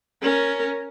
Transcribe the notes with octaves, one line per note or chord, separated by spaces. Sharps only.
C#4 A#4